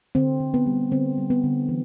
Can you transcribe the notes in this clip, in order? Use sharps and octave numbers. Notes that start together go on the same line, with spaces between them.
D3 C4
D3
B3
G3
D3 C4
G3
B3
D3
E3